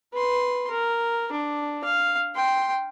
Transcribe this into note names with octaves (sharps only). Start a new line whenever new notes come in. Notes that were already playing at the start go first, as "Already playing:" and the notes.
B4 C6
A#4
D4
F5
G5 C6